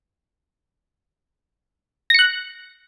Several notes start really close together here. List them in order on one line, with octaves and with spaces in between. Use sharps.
A#6 C#7 F#6